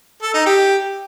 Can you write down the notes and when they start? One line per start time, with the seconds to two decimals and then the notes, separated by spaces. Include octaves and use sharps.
0.22 A4
0.34 D#4
0.46 G4